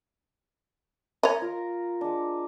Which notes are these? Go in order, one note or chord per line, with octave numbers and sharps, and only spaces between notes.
C#5 D#5 A#5
F4 A#4
G#3 D4